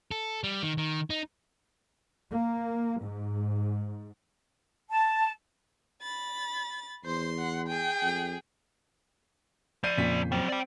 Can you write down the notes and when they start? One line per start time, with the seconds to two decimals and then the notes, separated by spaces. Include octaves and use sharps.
0.11 A4
0.44 G3
0.63 D#3
0.78 D#3
1.10 D#4
2.32 A#3
3.03 G#2
4.90 A5
6.02 B5 A6
7.05 E2 C5 C6
7.39 F#5
7.68 G#4 G5
8.02 F2
9.84 F3 D5 G6 C7 D#7
9.98 F2 A#2 C#3 B6
10.32 F#3 C4 G5
10.48 D5 G5